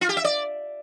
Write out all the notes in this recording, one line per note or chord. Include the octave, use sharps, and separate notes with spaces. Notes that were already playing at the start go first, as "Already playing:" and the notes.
F4
G4
E5
D5